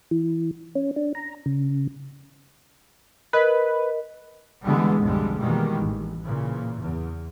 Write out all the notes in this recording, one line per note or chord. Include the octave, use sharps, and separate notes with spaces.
E3
C#4
D4
A#5
C#3
A#4 B4 D#5
D3 E3 G3 G#3 B3
B1 F2 D3 G3 G#3
B2 D#3 E3 G3 G#3 A#3
A1
A#2 C#3 E3
E2